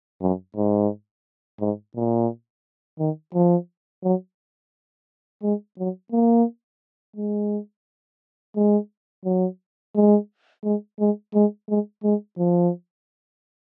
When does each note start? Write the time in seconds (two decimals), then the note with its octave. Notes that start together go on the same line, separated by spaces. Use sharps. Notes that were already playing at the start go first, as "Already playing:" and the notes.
0.21 F#2
0.56 G#2
1.60 G#2
1.96 A#2
2.99 D#3
3.35 F3
4.03 F#3
5.43 G#3
5.78 F#3
6.12 A#3
7.16 G#3
8.56 G#3
9.25 F#3
9.95 G#3
10.64 G#3
11.00 G#3
11.34 G#3
11.69 G#3
12.04 G#3
12.38 F3